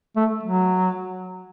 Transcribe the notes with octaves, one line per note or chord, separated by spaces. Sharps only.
A3
F#3